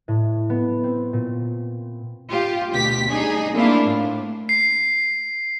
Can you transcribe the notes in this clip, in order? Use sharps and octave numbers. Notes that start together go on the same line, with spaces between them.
A2
B3
C4
A#2
F4 G4
D2 B2 G4 B6
G3 D4 D#4 G#4
A3 A#3 C4 D4 E4 F4
A2
C7